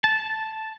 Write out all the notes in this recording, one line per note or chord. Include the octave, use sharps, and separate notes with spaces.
A5